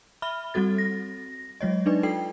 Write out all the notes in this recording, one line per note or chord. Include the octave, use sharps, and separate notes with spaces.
E5 B5 F6 G7
G3 C4 F#4 A4 A6
A#6
F#3 G#3 C#5 D#5
D4 D#4 B4 D5
F4 A4 G5 C7